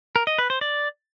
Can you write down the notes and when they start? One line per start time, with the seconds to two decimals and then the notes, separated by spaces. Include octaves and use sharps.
0.16 A#4
0.27 D#5
0.38 B4
0.50 C5
0.61 D5